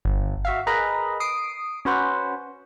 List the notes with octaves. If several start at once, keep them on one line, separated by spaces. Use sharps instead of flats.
G1
F#4 E5 F5
G#4 A#4 B4 D#5 A#5 B5
D#6 C7 D7
C#4 F#4 B4 C5 F#5